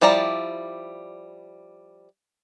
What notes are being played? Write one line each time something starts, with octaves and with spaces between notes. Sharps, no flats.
F3 G3 E4 D5 A#5